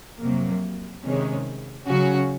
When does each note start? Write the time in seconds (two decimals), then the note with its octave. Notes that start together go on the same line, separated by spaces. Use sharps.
0.20 F2 C3 F#3 A#3
1.03 C3 D#3 G#3 C#4
1.86 C#3 F#3 C#4 F#4